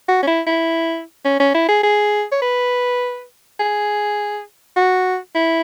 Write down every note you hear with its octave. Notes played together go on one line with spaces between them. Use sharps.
F#4
C#4
E4
E4
C#4
C#4
E4
G#4
G#4
C#5
B4
G#4
F#4
E4